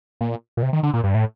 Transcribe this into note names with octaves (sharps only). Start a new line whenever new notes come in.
A#2
A#2
C3
D#3
D3
A#2
G2
A2